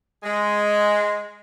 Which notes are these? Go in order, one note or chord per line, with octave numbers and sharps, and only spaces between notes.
G#3